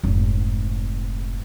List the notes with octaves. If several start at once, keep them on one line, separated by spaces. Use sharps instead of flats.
F1 G#2